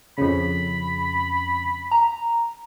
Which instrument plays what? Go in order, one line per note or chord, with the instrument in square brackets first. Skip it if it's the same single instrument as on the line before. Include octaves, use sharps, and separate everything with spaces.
[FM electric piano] F2 C#3 [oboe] B5
[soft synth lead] A#5